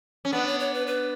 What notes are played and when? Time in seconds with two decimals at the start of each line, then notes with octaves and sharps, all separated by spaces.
0.25 C#4
0.32 B3 D4 B4
0.47 C#5
0.60 C#5
0.74 B4
0.87 B4